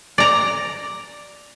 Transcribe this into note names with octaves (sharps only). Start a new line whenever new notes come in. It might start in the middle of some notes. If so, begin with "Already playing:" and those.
D5 A#5